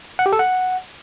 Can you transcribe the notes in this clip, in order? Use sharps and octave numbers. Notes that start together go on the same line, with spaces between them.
F#5
G4
A4
F#5